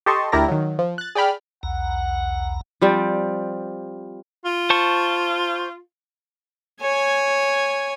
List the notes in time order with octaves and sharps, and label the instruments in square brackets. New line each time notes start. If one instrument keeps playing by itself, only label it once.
[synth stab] G4 A4 D#5 A5 C6 C#6
D2 E4 G4 A#4 D5 A#6
D#3 F#3
F3
F#6 A6
G#4 D5 G5 B5 F6
[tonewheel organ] B1 E2 A#5 [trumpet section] F#5
[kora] F3 G3 C4
[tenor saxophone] F4
[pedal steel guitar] C5 A5 C#6
[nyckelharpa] C#5 G#5